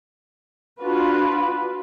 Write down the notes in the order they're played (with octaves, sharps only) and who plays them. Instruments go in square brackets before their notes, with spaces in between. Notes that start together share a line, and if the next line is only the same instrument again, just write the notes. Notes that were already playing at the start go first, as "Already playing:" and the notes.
[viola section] D4 F4 F#4 B4